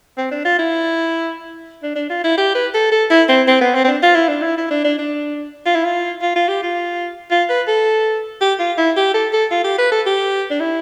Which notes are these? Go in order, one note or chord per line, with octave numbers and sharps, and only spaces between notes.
C4
D4
F4
E4
D4
D4
F4
E4
G4
B4
A4
A4
E4
C4
C4
B3
C4
C4
D4
F4
E4
D4
E4
E4
D4
D4
D4
F4
E4
F4
F4
F4
G4
F4
F4
B4
A4
G4
F4
E4
G4
A4
A4
F4
G4
B4
A4
G4
D4
E4